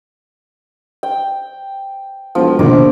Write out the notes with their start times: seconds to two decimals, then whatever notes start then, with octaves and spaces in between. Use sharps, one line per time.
1.03 G5
2.35 E1 F3
2.59 A#1 B2 D3 D#3 D6